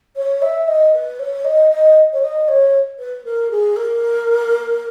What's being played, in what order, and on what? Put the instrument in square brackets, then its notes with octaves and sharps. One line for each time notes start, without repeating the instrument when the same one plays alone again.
[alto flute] C#5
E5
D#5
B4
C#5
D#5
D#5
C#5
D#5
C#5
B4
A#4
G#4
A#4